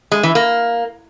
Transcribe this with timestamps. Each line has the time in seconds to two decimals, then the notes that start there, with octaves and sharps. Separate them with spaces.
0.12 G#3
0.23 E3
0.35 A#3